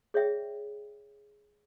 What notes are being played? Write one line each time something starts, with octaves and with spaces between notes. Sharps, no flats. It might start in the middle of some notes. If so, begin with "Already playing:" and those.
G#4 C#5 D5 E5 G5